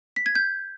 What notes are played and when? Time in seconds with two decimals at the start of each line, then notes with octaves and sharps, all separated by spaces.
0.16 B6
0.26 G#6
0.35 G6